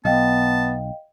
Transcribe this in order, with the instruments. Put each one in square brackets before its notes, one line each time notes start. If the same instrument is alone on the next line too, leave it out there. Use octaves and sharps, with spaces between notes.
[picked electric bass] B1 [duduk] B3 [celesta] D#5 F5 G5 [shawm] A5